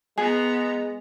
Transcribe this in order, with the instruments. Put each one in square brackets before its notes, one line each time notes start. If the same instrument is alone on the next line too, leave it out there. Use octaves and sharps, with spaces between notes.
[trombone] G#3 [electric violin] B3 A#5 [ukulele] G#4